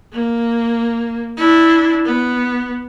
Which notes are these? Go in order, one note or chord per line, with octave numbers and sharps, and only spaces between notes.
A#3
D4 E4
B3